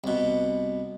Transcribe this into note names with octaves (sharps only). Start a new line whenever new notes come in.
C2 B2